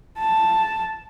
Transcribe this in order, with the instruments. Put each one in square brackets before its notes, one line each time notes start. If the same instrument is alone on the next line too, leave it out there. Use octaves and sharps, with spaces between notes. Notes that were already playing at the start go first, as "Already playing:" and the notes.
[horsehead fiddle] A5